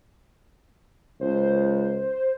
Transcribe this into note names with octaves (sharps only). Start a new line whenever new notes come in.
C#2 C5